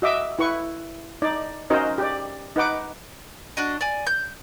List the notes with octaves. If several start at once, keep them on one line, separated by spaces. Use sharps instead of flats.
F#4 D#5 E5 D6
E4 B4 C#6
D#4 D5
C#4 D#4 F#4 A#4 C5 D#5
G4 D5
D#4 B4 F#5 D6
D4 F#4 D#5
D5 G#5
G6